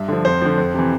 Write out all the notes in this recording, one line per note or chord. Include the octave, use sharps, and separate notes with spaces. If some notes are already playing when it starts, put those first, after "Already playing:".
Already playing: G2 E5
D3 F3
F2 C5
D3 F3
F2
C3 E3